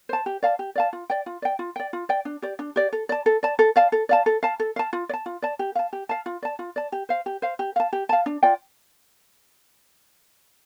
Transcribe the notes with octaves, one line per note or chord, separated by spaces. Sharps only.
C5 A5
G4
D5 F5 A5
G4
D5 F5 A5
F4
D5 G5
F4
D5 G5
F4
D5 G5
F4
D5 G5
D4
G4 D5
D4
G4 D5
A4
D5 A5
A4
D5 A5
A4
D5 F5 A5
A4
D5 F5 A5
A4
F5 A5
A4
F5 A5
F4
D5
A5
F4
D5 A5
G4
F5 A5
G4
F5 A5
F4
D5 A5
F4
D5 A5
G4
C5 F5
G4
C5 F5
G4
F5 A5
G4
F5 A5
D4
F4 D5 G5